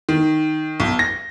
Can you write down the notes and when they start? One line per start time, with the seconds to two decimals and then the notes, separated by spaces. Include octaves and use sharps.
0.09 D#3
0.80 B1
0.99 A#6